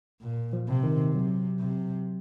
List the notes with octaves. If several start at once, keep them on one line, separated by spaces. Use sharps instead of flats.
A#2
F3
C3
D#3
C3 F#3
C3